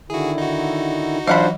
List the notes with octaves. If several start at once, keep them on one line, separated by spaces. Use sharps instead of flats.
D3 D#3 E4 F#4 G#4
D#4 F#4
E3 F#3 D4 F4 C5 F5 F#5 B5